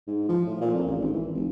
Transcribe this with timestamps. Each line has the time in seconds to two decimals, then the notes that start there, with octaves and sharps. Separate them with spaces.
0.07 G#2
0.28 F3
0.46 A2
0.60 A#2
0.73 F2
0.86 A1
0.98 G#1
1.13 E3
1.33 F1